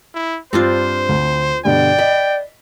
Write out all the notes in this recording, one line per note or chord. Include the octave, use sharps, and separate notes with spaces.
E4
G2 C4 D4 F4 C5
D2
G2 B2 D3 D5 G5
D#5 B5